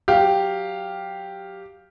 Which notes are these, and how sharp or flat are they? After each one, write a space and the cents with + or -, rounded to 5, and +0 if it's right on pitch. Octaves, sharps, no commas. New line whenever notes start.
F#3 -10 G4 +0 F5 +0